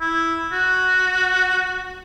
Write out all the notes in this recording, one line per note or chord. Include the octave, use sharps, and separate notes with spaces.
E4
F#4